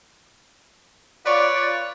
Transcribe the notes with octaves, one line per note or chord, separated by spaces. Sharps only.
F4 B4 C#5 D5